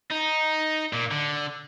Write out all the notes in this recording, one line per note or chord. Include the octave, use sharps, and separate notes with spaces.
D#4
A#2
D3